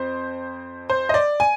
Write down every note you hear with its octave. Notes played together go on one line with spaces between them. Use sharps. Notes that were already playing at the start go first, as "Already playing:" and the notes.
Already playing: F2 C5
C5
D#5
D5
G#5